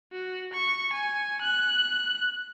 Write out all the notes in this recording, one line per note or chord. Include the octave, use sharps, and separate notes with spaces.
F#4
C#6
G#5
F#6